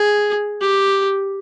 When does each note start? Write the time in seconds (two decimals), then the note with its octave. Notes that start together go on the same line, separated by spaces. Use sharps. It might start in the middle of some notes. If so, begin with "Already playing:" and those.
Already playing: G#4
0.61 G4